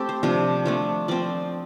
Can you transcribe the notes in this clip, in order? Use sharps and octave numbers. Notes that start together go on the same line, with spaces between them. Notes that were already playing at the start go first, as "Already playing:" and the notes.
Already playing: A3 C4 G4 A4
C5
C3 F3 D4
F3 A3 D4
F3 C4 D5